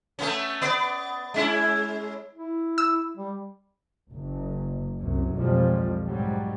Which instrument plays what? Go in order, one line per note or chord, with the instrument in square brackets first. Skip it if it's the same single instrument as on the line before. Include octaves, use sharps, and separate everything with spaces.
[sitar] A3 B3 C#4
B3 D5
G#3 C#4 E4
[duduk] E4
[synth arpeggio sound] E6
[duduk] G3
[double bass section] F#1
C2 F#2
B1 F2 F3 G3 G#3
G#2 F#3 G3